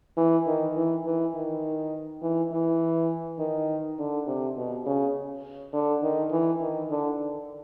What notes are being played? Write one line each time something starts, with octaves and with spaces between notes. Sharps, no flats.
E3
D#3
E3
E3
D#3
E3
E3
D#3
D3
C3
B2
C#3
D3
D#3
E3
D#3
D3